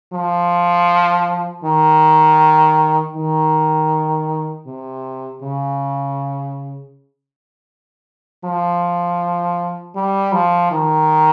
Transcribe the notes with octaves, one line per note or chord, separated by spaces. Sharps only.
F3
D#3
D#3
C3
C#3
F3
G3
F3
D#3